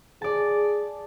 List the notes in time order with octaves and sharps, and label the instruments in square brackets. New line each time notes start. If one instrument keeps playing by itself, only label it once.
[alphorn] G#4 [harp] D5 A5